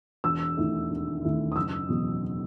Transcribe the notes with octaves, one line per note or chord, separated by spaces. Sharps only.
E1 E6
D#2 D#3 A3 E4
E1
D#2 D#3 A3 E4
D#6
F#1 E6
E2 B2 F#3